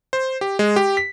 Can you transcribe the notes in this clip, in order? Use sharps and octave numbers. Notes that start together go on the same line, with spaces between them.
C5
G4
G#3
G4
B6